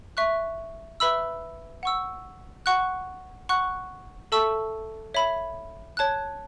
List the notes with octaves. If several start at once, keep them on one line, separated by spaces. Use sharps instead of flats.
E5 C#6 F#6
B4 E5 B5 E6
F#5 C#6 E6
F#5 C#6 F#6
F#5 C#6 F#6
A4 E5 A5 C#6 E6
C#5 E5 B5
C#5 A5 F#6